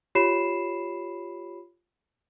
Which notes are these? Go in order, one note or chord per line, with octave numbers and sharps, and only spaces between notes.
F4 G4 C#5 B5 C7 E7